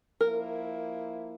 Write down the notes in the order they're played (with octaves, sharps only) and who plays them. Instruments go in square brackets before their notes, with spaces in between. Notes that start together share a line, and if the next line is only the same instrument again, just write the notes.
[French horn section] F3 A#3 E4 [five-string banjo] A#4